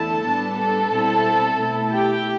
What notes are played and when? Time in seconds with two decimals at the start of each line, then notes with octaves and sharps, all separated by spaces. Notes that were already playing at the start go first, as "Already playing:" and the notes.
Already playing: E2 D3 A3 E4 A4 A5
0.26 A2 G3 B3 D4
0.58 A4 A5
0.92 B2 G3 C4 E4
1.59 B2 A3 E4
1.93 G4 G5